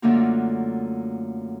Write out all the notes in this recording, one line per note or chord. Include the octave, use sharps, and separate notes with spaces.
F#2 D3 A3 A#3 D4 F4